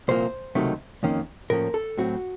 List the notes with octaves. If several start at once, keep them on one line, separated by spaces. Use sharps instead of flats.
C2 A#2 F3 A#3 C5
C#2 C3 D#3 F#3 A3
F2 D#3 A#3 C#4
A2 F3 A#3 C#4 A#4
A4
A2 F#3 C4 F#4